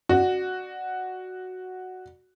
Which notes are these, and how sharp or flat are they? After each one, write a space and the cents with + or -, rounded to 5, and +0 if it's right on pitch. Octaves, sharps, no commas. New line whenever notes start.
F#4 +0 D5 +20